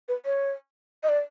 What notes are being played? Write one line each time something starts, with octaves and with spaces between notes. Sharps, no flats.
B4
C#5
D#5
D5